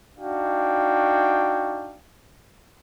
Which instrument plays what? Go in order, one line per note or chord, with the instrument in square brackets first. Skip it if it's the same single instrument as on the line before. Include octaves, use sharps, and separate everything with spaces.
[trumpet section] D4 D#4 F#4 F5 G5